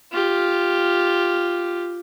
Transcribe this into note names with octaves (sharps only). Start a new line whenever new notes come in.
F4 G4